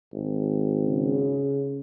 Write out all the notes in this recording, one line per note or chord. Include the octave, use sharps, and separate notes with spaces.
G#1
C#3